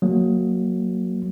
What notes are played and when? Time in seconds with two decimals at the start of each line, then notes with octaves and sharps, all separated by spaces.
0.02 F#3 A#3